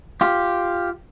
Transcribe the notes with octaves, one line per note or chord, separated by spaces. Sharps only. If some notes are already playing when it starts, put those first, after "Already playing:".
F4 G4